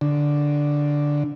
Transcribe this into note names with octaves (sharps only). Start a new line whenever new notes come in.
D3